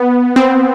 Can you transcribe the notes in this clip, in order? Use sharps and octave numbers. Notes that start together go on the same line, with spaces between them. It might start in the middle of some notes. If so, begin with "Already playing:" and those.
Already playing: B3
C4